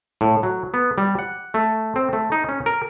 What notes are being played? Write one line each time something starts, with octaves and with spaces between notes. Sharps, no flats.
A2
F#3
B3
G3
F#5
A3
C4
A3
D#4
C#4
A#4